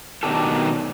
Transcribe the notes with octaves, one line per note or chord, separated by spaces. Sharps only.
B2 D#3 F#3 D4 G4 A4